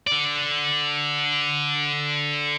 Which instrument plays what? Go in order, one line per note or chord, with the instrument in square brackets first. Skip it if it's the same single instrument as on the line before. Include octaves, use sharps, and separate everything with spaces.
[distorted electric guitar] D3 D5